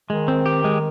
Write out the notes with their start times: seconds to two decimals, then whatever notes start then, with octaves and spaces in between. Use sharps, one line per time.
0.10 D#3 G#3
0.28 C4
0.46 G4
0.64 G#3